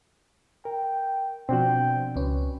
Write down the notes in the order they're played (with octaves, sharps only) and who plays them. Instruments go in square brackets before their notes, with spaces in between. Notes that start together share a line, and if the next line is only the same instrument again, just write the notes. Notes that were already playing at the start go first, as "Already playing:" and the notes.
[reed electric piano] A#4 [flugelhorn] G5
[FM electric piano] B2 F3 [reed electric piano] C4 D4 F#4 [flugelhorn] G5
[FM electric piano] C#2 C#4 [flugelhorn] B4